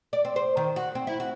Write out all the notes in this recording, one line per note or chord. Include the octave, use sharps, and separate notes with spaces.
D5
C4
C5
D#3
F#4
C4
E4
F#4